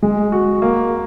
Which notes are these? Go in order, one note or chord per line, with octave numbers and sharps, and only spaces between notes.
G#3
F#4
A#3